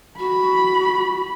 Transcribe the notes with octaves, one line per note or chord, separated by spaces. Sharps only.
F#4 B5